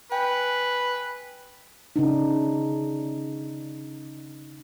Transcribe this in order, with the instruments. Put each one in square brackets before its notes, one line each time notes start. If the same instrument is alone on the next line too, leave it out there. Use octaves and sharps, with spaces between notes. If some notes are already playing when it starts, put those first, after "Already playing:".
[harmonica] B4 [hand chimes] G5 G#5
[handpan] C#3 D4 D#4